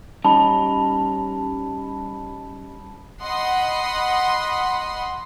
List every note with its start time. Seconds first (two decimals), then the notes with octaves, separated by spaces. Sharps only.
0.25 G3 C#4 D#4 A5 B5
3.22 D#5 F#5 B5 C6